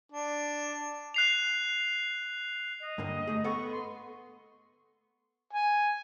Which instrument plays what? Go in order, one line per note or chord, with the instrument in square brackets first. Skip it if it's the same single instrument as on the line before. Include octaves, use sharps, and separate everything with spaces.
[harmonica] D4
[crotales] F#6 C7 F7
[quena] D#5
[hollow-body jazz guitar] G2 D3 A#3
A3 G#4
[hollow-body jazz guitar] B3 A4 F#5 [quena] C#6
[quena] C6
[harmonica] G#5